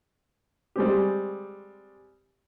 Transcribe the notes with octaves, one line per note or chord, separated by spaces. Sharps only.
G3 G#3 C4 G4